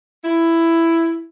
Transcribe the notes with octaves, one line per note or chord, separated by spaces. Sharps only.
E4